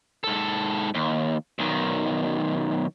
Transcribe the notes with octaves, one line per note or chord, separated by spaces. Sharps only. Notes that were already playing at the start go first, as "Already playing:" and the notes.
G#2 A4
D#2
B1 D#3